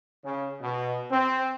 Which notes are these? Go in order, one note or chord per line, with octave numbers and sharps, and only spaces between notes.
C#3
B2
C4